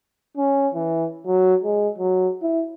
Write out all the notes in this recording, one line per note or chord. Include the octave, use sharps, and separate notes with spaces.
C#4
E3
F#3
G#3
F#3
E4